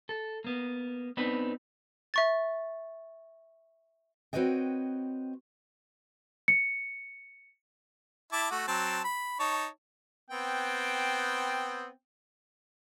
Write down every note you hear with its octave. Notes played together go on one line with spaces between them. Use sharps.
A4
A#3 B3
B3 C4 D4 D#4 B4
E5 C#6 A6
C4 F#4 B4 C#5 D#5 G5
C#7
E4 A5 D6
A3 F#4
F#3 C4 A5
B5
D#4 C#5 A5
B3 C4 G5